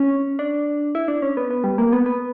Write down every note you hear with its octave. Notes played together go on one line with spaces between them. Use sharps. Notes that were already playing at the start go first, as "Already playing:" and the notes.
Already playing: C#4
D4
E4
D4
C#4
B3
B3
G3
A#3
B3
B3